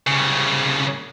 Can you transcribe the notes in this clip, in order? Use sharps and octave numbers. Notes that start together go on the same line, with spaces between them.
C2 C#3